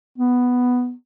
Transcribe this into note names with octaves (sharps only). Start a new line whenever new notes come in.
B3